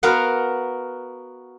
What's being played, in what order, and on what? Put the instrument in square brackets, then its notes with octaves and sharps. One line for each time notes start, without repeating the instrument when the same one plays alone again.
[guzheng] B3 F#4 A#4 F5 F#5